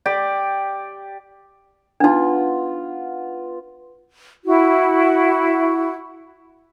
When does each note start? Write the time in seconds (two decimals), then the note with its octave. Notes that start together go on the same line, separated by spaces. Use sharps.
0.06 G4 D5
2.00 B3 D4 D#4 F4
4.44 E4 F#4